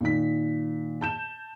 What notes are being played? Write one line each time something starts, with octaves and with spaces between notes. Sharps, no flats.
A#2 D#3 B6
A5 G6 E7